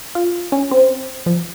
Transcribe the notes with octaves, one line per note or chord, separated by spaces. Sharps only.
F4
C#4
C4
F3